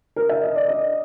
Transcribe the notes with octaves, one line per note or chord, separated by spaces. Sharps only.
A#4
E5
D#5
D5
D#5